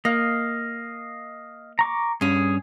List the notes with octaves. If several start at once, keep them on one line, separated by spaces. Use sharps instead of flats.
A#3 D#5 F5
A#5 C#6 D6
G2 C#4 G#4